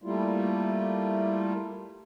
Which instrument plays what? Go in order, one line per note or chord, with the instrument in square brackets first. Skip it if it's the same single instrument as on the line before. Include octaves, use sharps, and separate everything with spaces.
[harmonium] G3 A3 A#3 E4 F4